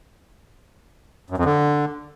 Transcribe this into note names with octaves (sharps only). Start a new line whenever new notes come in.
F#2
F2
D3